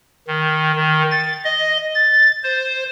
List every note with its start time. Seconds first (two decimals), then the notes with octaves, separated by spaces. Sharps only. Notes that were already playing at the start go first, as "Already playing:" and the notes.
0.27 D#3
0.76 D#3
1.11 A6
1.44 D#5
1.95 A6
2.43 C5